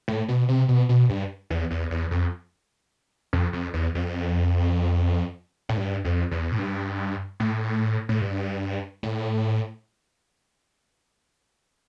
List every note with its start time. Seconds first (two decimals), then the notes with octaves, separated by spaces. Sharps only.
0.08 A2
0.28 B2
0.49 C3
0.68 B2
0.89 B2
1.09 G2
1.50 E2
1.71 E2
1.91 E2
2.11 F2
3.33 F2
3.53 F2
3.74 E2
3.95 F2
5.69 A2
5.77 G2
6.04 F2
6.31 E2
6.52 A2
6.59 G2
7.40 A2
8.09 A2
8.21 G2
9.03 A2